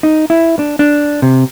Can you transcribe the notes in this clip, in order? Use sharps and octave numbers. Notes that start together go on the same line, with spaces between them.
D#4
E4
D4
D4
C3